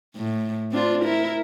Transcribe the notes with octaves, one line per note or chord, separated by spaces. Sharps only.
A2
C4 D4 F4
E4 A#4